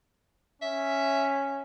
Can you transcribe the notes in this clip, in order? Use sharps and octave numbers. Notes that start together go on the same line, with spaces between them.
C#4 E5